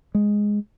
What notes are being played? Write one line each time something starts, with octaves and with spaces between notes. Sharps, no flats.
G#3